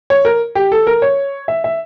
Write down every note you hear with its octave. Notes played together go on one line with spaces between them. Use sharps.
C#5
A#4
G4
A4
A#4
C#5
E5
E5